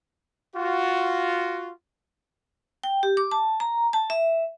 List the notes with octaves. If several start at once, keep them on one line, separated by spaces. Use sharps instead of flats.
F4 F#4
G5
G4
D6
A5
A#5
A5
E5